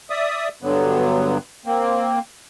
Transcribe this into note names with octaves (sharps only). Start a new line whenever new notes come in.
D5 E5 D#6
G2 D3 F#3 B3
A#3 C4